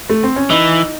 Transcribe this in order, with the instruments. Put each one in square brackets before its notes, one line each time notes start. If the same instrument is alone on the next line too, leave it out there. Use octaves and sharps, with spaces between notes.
[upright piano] A3
C4
C#4
[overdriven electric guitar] E3 [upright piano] D#4